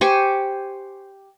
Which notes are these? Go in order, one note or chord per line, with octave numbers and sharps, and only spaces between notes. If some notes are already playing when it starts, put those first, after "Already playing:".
G4 C5 G#5 C#6